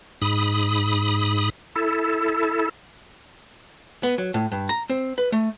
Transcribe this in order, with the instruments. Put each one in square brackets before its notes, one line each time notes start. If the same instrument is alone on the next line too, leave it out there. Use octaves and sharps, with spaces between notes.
[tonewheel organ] G#2 B5 D#6
E4 A4
[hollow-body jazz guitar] B3
F#3
A2
G2
A#5
C4
B4
A3